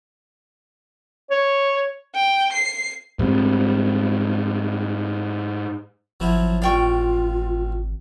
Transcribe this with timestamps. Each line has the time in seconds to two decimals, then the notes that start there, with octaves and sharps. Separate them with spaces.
1.30 C#5
2.15 G5
2.53 C7
3.19 G#2 G3 C4
6.20 G#1 F3 F#3 E4
6.62 A1 F4 D5 F5 G5 C#6